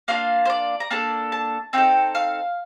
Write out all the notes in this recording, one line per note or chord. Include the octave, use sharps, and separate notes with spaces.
A#3 D4 F4 F5
C5
D5
A#5
A#3 D4 A4 A5
A5
C4 D#4 A4 G5
F5